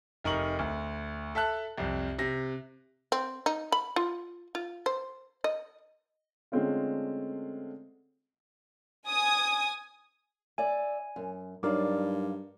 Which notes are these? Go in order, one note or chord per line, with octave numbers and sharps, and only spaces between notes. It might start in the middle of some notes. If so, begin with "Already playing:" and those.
F1 D#4 A#4 C#6 F#7
D2
A4 E5 A5 F#6
C2 F2
C3 A#6
C4
D#4
B5
F4
F4
C5
D#5
D3 G#3 A3 C4 C#4 F4
G#5 D#6
D5 E5 G#5
F#2
G2 F#3 D#4 A#4 D5 F5 D6